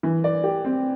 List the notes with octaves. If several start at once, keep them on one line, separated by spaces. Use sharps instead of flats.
E3
D5
G4
C4